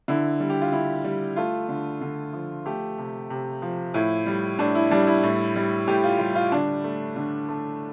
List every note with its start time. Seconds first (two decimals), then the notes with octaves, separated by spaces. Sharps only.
0.08 D3 E4
0.40 G3
0.50 G4
0.61 F4
0.72 D3 E4
1.04 G3
1.36 A3 F4
1.69 D3
2.01 D3
2.33 F3
2.66 A3 G4
2.98 C3
3.30 C3
3.62 F3
3.94 A2 E4
4.26 G3
4.59 A2 D4
4.75 E4
4.91 G3 D4
5.07 E4
5.23 A2
5.56 G3
5.88 A2 G4
6.04 F4
6.19 G3 F4
6.35 F4
6.52 D3 D4
6.84 A3
7.16 D3
7.49 A3